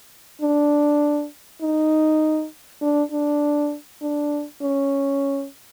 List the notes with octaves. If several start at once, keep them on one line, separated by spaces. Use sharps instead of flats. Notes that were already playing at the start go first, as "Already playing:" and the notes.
D4
D#4
D4
D4
D4
C#4